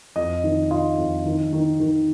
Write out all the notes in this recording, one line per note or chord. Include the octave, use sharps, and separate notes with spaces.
F2 D#5
D#3
F4 D#5
F2
D#3
D#3
D#3